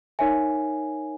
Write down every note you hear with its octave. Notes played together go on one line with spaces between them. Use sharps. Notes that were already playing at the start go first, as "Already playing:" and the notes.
D#4 A#4 C#5 E5 G#5